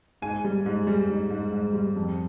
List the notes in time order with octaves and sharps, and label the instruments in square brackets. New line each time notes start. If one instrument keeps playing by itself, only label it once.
[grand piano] G#2 G#5
G3
G#2
G3
G#2
G#2
G#2
G3
F2